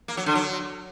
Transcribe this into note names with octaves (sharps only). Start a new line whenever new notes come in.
A#3
F#3
D3
F#3